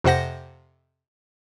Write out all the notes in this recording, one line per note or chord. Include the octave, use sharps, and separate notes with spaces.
F2 C3 C5 F#5 A#6